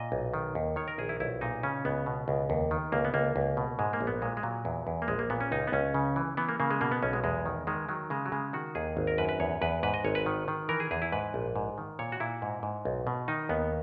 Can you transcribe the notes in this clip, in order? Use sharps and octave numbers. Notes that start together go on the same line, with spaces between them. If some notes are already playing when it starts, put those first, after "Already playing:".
Already playing: A#2 D#5
B1
D#3
D#2
D#3 C#5
A#4
A#1 G#4
E4
B1 E4
A#2 D#4
C#3 C#4
C#2 B3
B2
C#2
D#2
D#3
C#2 A#3
B3
C#2 A#3
C#2
B2
G#2 G#3
A#3
A#1
B3
A#2 G#3
G#3
A#2 F#3
E2
E2
A#3
A#1 G#3
A#3
A#2 B3
C#4
C#2 D#4
B3
C#2 C#4
C#3
E3
E3 B3
A#3
C#3 A#3
G#3
B2 A#3
B3
B1 C#4
G#3
E2 G#3
D#3
D#3 G#3
D#3 F#3
C#3 G#3
F#3
C#3 G#3
D#3 F#4
D#2 G#4
G#1
A#4
F#2 B4
B4
E2 C#5
E2 B4
G#2 B4
D#5
G#1 C#5
B4
D#3
D#3
E3 A#4
G#4
E2 G#4
E4
G#2 B4
A#1
G#2
D#3
A#2 C#5
F#4
A#2 E4
G#2
G#2
B1
B2
D#3 D#4
D#2 B3